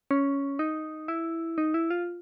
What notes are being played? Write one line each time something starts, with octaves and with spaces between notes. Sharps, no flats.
C#4
D#4
E4
D#4
E4
F4